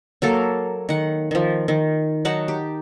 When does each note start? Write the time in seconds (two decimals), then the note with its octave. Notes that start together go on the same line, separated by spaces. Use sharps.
0.22 F#3 A#3 A4 F5
0.89 D#3 F#5
1.31 D#3 F3
1.68 D#3
2.25 F#3 D#4 F#5 A5
2.48 G4